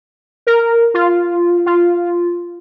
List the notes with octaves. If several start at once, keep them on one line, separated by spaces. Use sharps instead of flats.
A#4
F4
F4